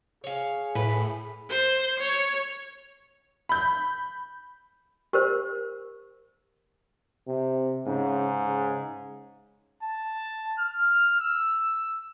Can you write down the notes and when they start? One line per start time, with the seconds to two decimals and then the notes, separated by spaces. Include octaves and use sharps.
0.24 G#4 C#5 F5
0.75 A2 B4
1.50 C5
1.99 C#5
3.49 B5 G6
5.13 G4 A#4 C5
7.28 C3
7.87 G#2 C#3
8.47 C#3
9.83 A5
10.59 F6
11.20 E6